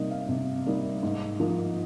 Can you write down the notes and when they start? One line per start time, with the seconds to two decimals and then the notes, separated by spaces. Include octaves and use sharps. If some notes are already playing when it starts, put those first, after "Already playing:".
Already playing: C3 G3 A#3 D#4 D#5
0.11 F5
0.29 C3
0.66 G3 A#3 D#4
1.03 G#2
1.40 F3 A#3 D#4